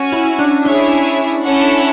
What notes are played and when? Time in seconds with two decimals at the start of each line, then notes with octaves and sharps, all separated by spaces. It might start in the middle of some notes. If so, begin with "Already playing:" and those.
Already playing: C#4 F#4 C#5 G#5
0.12 E4
0.39 D4
0.64 D4 E4 G#4 C#5 E5
1.43 C#4 E4 A4 C#5 F#5